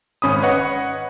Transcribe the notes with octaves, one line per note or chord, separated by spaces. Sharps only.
G#1 C#4 B5 D#6
B4 C#5 D#5 F#5